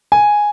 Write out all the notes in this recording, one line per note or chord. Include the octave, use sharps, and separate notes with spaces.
G#5